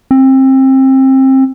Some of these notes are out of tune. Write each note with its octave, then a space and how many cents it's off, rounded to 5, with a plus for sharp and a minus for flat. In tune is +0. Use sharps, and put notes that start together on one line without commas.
C4 +25